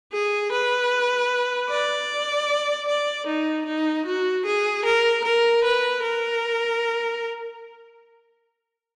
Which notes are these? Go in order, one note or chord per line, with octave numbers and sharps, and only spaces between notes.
G#4
B4
D5
D5
D#4
D#4
F#4
G#4
A#4
A#4
B4
A#4